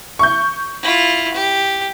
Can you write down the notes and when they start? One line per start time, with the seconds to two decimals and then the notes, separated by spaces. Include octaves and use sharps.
0.19 C#6 G6
0.82 E4 F4
1.34 G4